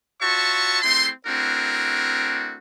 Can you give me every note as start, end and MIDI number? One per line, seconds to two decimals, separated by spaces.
0.22 0.81 65
0.22 0.81 66
0.22 0.81 73
0.22 0.81 76
0.22 0.81 81
0.22 0.81 85
0.82 1.09 57
0.82 1.09 60
0.82 1.09 64
0.82 1.09 68
0.82 1.09 84
1.26 2.57 57
1.26 2.57 60
1.26 2.57 62
1.26 2.57 64
1.26 2.57 66
1.26 2.57 70